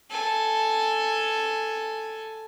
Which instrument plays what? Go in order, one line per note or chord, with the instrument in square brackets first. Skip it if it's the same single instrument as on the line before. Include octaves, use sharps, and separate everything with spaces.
[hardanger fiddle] A4 G#5